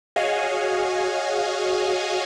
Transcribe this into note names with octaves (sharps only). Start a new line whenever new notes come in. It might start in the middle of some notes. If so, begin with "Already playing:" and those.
F#4 G#4 C#5 D#5 F5 G#5